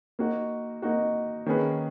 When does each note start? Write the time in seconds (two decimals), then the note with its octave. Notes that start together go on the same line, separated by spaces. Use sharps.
0.19 A#3 D#4 F#4
0.82 A#3 D#4 F#4
1.46 D#3 A#3 C#4 G#4 B4